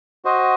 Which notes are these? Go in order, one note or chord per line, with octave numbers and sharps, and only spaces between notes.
F#4 C5 D#5